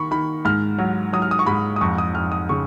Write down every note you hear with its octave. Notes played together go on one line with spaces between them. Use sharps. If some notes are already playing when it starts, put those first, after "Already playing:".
Already playing: D#3 B5 C#6
D#3 B5
G#2 F6
F#3
F#3 D#6
F6
D#6
C#6
G#2 B5
D#6
F2 C#6
D#6
F2 F6
D#6
C#3 C#6